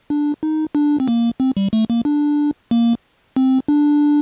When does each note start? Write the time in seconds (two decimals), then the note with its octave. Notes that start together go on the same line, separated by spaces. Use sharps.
0.10 D4
0.43 D#4
0.75 D4
1.00 C4
1.08 A#3
1.40 C4
1.57 G3
1.73 A3
1.90 A#3
2.05 D4
2.71 A#3
3.36 C4
3.68 D4